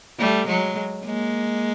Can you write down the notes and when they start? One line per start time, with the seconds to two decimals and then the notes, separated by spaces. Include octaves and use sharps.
0.19 G3 A3
0.47 F#3 G#3
1.05 G#3 A#3